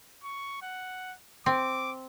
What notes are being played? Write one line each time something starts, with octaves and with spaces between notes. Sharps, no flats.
C#6
F#5
C4 D6